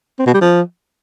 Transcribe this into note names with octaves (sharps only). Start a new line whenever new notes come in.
C4
B2
G3
F3